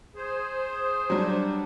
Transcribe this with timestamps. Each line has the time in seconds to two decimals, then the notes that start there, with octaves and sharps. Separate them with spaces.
0.16 G#4 C5
1.10 F#3 G3 D4